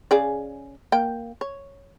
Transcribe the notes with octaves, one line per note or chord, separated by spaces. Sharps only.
C#3 G#4 D5
A#3 G5
C#5